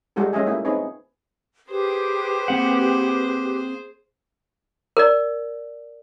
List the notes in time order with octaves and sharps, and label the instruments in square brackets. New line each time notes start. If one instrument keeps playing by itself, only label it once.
[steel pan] G3 G#3 F4 F#4 A4
G#3 C#4 F4 D#5 E5 G#5
A3 A#3 E4 F4
C4 D#4 G#4 B4 C#5
[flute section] G4 B4 [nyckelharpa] G#4 C5
[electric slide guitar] A#3 C4 F#5
[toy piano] A#4 D5